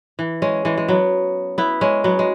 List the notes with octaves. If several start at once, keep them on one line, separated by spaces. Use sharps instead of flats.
E3
G#3 C#4
E3 G#3
G#3
F#3 B3
B3 E4
G#3 C#4
F#3 B3
G#3